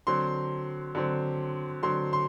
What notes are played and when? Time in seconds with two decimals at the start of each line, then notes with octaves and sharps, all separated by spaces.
0.07 D3 F#3 C4 C6
0.95 D3 F#3 C4
1.82 D3 F#3 C4 C6
2.13 C6